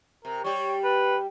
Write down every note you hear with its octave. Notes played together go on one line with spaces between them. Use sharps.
C3 A#4
G3 G4 C#5
B4